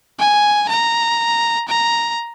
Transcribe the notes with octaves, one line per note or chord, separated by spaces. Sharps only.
G#5
A#5
A#5